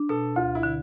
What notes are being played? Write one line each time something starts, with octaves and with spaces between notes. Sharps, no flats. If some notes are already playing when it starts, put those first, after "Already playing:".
Already playing: D4
B2 A4
D2 F4
E4
D3